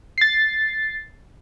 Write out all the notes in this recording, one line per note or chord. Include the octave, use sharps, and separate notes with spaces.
A6 C7